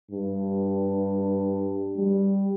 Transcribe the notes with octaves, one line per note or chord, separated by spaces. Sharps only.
G2
G3